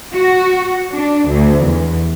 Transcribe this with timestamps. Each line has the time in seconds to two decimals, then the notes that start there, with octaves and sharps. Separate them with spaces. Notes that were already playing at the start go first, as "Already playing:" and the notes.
0.13 F#4
0.94 D4
1.29 D2
1.65 E2